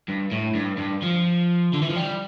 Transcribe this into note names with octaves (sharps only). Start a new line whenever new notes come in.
G2
A2
G2
G2
F3
D3
E3
F3
G3